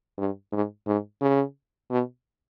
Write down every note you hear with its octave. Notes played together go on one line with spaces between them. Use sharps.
G2
G#2
G#2
C#3
B2